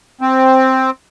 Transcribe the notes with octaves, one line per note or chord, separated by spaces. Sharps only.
C4